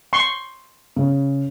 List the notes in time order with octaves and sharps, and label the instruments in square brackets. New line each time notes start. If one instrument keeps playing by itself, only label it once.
[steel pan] C6 C#6
[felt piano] C#3